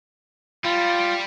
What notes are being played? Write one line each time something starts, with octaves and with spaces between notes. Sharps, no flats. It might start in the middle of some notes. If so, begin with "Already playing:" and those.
G3 F4